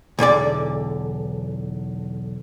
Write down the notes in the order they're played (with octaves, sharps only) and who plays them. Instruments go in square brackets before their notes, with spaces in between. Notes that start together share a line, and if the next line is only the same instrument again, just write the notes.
[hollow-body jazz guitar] B1 E2 D3 D5